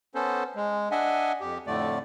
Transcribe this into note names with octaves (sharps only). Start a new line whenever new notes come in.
B3 C#4 A4 C5
G#3
D4 D#5 E5 F#5 G#5
F2 G4
F2 A2 D3 A3 D5